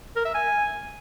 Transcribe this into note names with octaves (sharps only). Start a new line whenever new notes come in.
A#4
E5
G#5